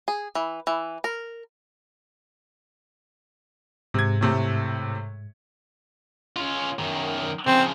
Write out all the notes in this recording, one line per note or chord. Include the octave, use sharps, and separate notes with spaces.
G#4
E3
E3
A#4
G#2 C3 G#6
A2 C3 A3
C#4 F4
F#2 D#3
C#3 F3 C4